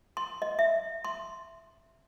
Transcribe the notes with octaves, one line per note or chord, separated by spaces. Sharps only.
C6
D#5
E5
C6